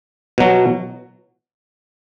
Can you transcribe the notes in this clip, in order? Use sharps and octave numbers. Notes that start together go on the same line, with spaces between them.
B2 F#3